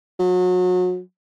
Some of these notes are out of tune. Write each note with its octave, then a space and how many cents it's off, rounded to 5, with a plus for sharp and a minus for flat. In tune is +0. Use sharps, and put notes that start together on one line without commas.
F#3 -30